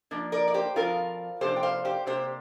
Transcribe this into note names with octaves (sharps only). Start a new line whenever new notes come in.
F3 A#3 D4
A#4 D5
D5
G4 C5
F3 C4 F4 A#4
C3 F3 A#3 D4 G4 C5
G5
C5 F5
G4 C5
C3 A#3 D4 G4 C5